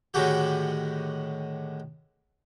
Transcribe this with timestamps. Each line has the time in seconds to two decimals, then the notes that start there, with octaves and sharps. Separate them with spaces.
0.14 A2 D3 D#3 G#3 F#4 G4